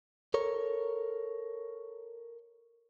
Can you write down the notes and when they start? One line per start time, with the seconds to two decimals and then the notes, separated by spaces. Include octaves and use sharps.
0.34 A4 A#4 C#5